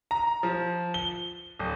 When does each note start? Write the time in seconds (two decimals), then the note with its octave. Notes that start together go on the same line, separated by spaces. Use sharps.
0.11 A#5
0.43 F3
0.94 G7
1.59 D1